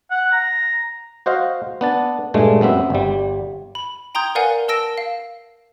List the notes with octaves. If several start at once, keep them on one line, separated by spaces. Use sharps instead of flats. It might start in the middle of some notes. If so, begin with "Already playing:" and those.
F#5
A#5
F#4 C5 D#5 F5
B3 D4 A5
G2 A#2 G#3 A3
F#2 B3 C4 E5
G1 G3
B5
G5 A#5 C6 D#6 G6 G#6
A#4 B4 D5 F5 F#5 G#5
A#4 A5 E6 A#6 D7 E7
F5